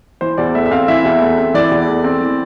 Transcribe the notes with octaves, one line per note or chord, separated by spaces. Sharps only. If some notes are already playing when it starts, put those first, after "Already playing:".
E3 C5
E2 D5
A3 E5
E5
C4 F5
E3 E5
E2
A3
C4
E3 D5
E2
A3
C4
E3